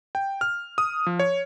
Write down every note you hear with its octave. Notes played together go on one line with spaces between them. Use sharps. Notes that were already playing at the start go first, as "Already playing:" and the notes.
G5
F6
D#6
F3
C#5